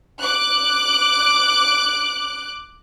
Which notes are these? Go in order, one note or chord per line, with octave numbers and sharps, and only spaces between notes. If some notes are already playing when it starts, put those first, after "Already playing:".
D6 F#6